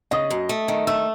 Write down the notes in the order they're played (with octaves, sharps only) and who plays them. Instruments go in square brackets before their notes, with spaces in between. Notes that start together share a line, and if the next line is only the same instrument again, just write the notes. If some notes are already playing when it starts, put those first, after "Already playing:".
[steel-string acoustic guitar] C#3 [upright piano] D#5 D#6
[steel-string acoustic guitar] F#2
A3
D#3
[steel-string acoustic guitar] A3 [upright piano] E5 E6